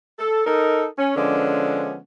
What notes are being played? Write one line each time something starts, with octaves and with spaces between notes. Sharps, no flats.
A4
D#4 A4 A#4
C#4
D3 F3 G#3 B3 C#4 D4